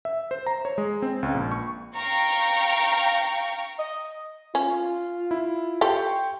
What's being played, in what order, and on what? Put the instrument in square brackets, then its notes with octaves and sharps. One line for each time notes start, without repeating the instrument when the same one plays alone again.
[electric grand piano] E5
C5
A#5
C#5
G#3
C4
C#2
A#1
C#6
[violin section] F5 G5 A#5 C#6
[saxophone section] D#5
[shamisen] C#4 [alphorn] F4
[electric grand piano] E4
[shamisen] G4 A4 [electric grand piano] G5 C6 C#6